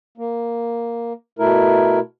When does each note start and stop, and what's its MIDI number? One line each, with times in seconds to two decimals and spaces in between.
0.18 1.13 58
1.39 1.99 47
1.39 1.99 57
1.39 1.99 64
1.39 1.99 70